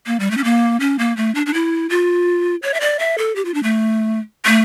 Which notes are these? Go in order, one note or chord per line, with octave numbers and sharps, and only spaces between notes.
A#3
G3
A3
C#4
A#3
C#4
A#3
A3
D4
D4
E4
F4
C#5
E5
D5
E5
A4
G4
F4
D4
A3
A3